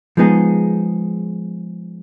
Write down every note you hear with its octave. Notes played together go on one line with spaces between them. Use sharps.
F3 G#3 B3 D#4 G#4